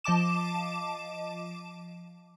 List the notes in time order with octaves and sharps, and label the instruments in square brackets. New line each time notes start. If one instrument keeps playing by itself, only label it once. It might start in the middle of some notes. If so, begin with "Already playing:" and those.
[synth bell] F3 D#5 A5 D6 E7